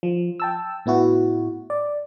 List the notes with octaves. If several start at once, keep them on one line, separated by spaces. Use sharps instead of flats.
F3
G5 A5 E6
A2 B3 E4 F#4
D5